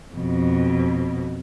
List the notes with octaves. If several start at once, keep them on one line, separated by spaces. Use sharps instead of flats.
F2 B2